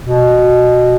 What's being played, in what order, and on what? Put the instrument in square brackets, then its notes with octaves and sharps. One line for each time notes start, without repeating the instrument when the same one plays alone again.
[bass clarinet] B2